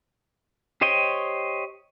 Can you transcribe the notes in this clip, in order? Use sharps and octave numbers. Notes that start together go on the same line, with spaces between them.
G4 C5 C#5 D#5 G5